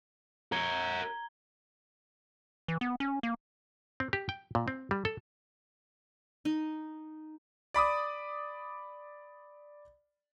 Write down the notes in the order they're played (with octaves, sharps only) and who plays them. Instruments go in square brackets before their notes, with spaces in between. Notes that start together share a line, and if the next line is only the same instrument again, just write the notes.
[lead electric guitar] A#4 C#5 [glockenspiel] A#5 G#6 G7
[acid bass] E3
B3
C#4
A#3
[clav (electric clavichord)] C4
G4
G5
A#2
C4
G3
A4
[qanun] D#4
[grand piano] D5 B5 D6 D#6